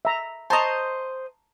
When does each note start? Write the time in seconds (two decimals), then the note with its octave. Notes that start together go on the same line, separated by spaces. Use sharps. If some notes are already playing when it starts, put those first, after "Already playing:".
0.05 E5 A#5
0.50 C5 D#5 A5 A#5 C#6